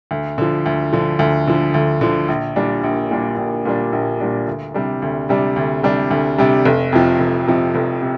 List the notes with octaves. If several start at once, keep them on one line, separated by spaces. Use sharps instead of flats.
D2
D3 F3
D2
D3 F3
D2
D3 F3
D2
D3 F3
A#1
A#2 G3 D4
A#1
A#2 G3 D4
A#1
A#2 G3 D4
A#1
A#2 G3 D4
D2
C3 G3 D4
D2
C3 G3 D4
D2
C3 G3 D4
D2
C3 G3 D4
F1
F2 C3 F3
F1
F2 C3 F3
F1
C3